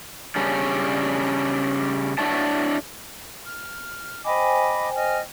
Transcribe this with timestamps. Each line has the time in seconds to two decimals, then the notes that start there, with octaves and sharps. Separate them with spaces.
0.36 C#3 G3 C#4 D4
2.18 D4 E4 F#4 C#5 D5 A5
3.45 F6
4.25 C5 D#5 G5 G#5 B5 D6
4.95 D#5 F6